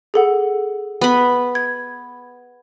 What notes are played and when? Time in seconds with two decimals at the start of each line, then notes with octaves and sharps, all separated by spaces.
0.14 G#4 A4 F#5
1.01 B3 B5
1.55 G#6